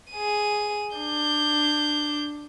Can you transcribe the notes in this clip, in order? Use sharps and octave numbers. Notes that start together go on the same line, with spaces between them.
G#4 D#7
D4 G6